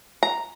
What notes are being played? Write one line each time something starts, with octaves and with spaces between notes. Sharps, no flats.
A#5